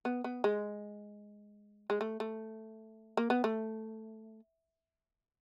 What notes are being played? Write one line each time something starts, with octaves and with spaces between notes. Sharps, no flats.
B3
B3
G#3
G#3
A3
A3
A#3
B3
A3